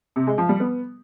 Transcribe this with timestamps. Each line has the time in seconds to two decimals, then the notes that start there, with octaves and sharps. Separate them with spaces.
0.16 C3
0.27 G#3
0.38 F3
0.49 G3
0.60 B3